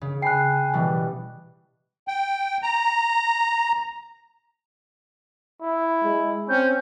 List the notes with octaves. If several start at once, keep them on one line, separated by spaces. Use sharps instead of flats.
C#3
G5 G#5 B5 F#6 C7
B2 E3 G3
G5
A#5
E4
G#3
C4 C#4 G6